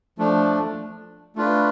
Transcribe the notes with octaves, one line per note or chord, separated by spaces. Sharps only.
F3 A3 D4
A3 D4 F4 B4